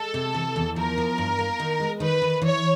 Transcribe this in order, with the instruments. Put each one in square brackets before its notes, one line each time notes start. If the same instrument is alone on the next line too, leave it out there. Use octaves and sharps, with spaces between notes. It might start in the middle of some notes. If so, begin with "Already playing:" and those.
Already playing: [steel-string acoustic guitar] G#3 [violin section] A4
[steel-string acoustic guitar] C3
E3
E2
[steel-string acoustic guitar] F3 [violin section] A#4
[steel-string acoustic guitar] F3
G2
A#3
D#3
G#3
[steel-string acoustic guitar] D#3 [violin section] B4
[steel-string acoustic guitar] D#3
[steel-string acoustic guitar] E3 [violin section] C#5